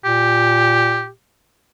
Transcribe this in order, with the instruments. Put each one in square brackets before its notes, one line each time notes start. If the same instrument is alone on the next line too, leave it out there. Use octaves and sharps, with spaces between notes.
[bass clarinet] A#2 [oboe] G4